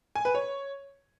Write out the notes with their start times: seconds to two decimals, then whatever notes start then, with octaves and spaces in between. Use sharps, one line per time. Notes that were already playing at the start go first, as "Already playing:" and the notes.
0.15 G#5
0.25 B4
0.35 C#5